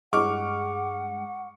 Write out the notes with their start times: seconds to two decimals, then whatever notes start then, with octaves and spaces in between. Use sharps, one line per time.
0.13 G2 G#3 F#5 C#6 D6 F6